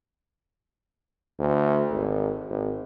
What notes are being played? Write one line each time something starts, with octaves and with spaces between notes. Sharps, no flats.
D2
G#1
G#1